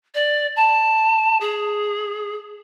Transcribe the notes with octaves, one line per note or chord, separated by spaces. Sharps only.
D5
A5
G#4